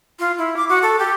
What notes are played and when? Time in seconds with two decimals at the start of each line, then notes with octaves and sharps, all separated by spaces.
0.19 F4
0.38 E4
0.56 D6
0.69 F#4
0.82 A4
0.99 G4